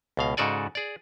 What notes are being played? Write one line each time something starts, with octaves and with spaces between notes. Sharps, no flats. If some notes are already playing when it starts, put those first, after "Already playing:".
C#2 B2 F5
G#2 C#3 F#4 A4 D5 G#5
G#4 D5